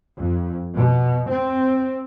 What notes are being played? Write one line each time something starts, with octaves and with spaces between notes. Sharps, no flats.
F2
B2
C4